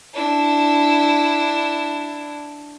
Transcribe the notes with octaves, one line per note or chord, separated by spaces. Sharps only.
D4 E4